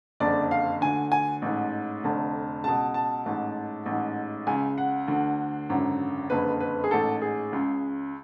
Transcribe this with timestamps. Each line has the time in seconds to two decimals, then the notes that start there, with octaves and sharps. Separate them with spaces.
0.20 F#1 F2 D3 D5
0.51 F5
0.81 D2 D3 G#5
1.12 G#5
1.42 A1 G#2
2.04 F1 F2 D3
2.64 C#2 B2 A5
2.94 A5
3.26 A1 G#2
3.86 A1 G#2
4.47 C#2 C#3 G#5
4.78 F#5
5.08 D2 D3
5.69 G#1 F#2 D3
6.30 F#1 F2 D3 B4
6.60 B4
6.84 G#4
6.91 A1 G#2 A4
7.22 G#4
7.53 C#2 C#3